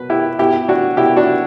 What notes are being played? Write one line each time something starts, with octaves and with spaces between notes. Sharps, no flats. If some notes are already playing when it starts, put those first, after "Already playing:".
Already playing: B2 B4
E4 G4
B2 E4 G4
D4 F#4
B2 E4 G4
D4 F#4